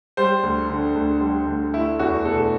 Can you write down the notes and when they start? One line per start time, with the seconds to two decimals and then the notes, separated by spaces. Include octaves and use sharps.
0.17 G3 C5
0.43 D2
0.69 D3
0.95 D2
1.21 G3
1.47 D2
1.74 A3 E4
1.99 E2 F#4
2.25 B2 A4